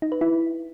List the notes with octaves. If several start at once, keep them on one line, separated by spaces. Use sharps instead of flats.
D#4
B4
E4